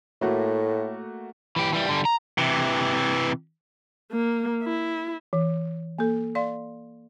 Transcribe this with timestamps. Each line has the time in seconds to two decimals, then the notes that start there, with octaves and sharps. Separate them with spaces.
0.21 A2 A3 A#3 F#4
1.56 E3 G4
1.73 E3 G3
1.89 D3 G3
2.05 A#5
2.38 C3 E3
4.11 A#3
4.63 E4
5.33 E3
5.99 A#3 A4
6.35 D5 F5 C6